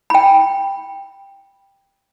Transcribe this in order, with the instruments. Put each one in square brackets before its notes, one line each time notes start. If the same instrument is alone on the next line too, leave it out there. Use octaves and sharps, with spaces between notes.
[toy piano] G5 B5